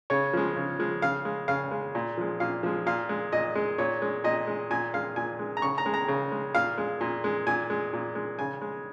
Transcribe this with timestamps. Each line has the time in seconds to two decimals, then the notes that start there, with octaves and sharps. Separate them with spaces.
0.10 C#3 C#5
0.33 F3 G#3
0.56 C#3
0.79 F3 G#3
1.02 C#3 F5
1.25 G#3
1.48 C#3 F5
1.71 G#3
1.95 A#2
2.17 F3 G#3
2.40 A#2 F5
2.63 F3 G#3
2.86 A#2 F5
3.09 G#3
3.32 A#2 D#5
3.55 G#3
3.78 A#2 C#5
4.02 G#3
4.24 A#2 D#5
4.47 G#3
4.71 A#2 G#5
4.94 G#3 F5
5.16 A#2 G#5
5.39 G#3
5.57 A#5
5.62 C#3 C#6
5.78 A#5
5.86 G#3
5.94 A#5
6.08 C#3
6.32 G#3
6.55 A#2 F5
6.78 G#3
7.01 A#2
7.24 G#3
7.47 A#2 G#5
7.70 G#3
7.93 A#2
8.15 G#3
8.39 C#3 G#5
8.61 G#3